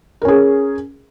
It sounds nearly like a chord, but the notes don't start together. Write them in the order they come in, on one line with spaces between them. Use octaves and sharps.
A#4 C#4 G#4